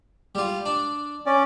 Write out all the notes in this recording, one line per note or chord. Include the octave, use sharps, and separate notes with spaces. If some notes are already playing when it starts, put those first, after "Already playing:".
G3 F4
D4
C#4 D5